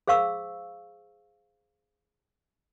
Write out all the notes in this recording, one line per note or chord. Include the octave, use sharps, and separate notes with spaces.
G#4 C5 F5 C#6 E6